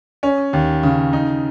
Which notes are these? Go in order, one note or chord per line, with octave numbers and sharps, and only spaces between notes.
C#4
D#2
C#3
D#4